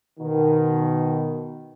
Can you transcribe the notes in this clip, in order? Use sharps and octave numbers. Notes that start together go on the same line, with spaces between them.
B2 D#3